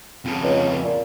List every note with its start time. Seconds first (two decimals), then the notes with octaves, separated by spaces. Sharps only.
0.25 F2 C#3
0.44 C#2
0.84 A#2